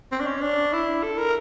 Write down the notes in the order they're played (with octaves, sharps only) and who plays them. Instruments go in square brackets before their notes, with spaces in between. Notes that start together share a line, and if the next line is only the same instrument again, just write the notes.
[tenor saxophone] C4
D4
C#4
D4
E4
A4
A#4